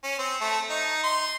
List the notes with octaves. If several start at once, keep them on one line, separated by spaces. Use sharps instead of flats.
C#4
C4
A3
D#4
C6